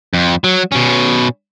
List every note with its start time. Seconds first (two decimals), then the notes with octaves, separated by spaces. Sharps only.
0.14 F2
0.44 F#3
0.72 B2 C#4